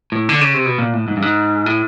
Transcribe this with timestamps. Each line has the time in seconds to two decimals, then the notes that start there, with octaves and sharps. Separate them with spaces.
0.12 A2
0.29 D3
0.41 C#3
0.54 C3
0.66 B2
0.79 A#2
0.93 A2
1.08 G#2
1.17 G2
1.22 G#2
1.66 A2